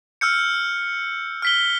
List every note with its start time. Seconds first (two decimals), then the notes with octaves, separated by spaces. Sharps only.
0.21 E6 F6 G6 C#7
1.42 F6 B6 G7